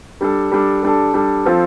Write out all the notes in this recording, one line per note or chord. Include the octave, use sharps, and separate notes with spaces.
G3 D4 A4
G3 D4 A4
G3 D4 A4
G3 D4 A4
F3 C4 F4 A4